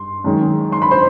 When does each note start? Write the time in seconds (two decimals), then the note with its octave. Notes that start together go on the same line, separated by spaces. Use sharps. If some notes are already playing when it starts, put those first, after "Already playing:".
Already playing: G2 C6
0.24 F#2 D#3 G#3
0.72 C6
0.82 B5
0.91 C5 C6